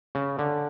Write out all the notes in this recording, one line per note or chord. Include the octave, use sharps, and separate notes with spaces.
C#3
D3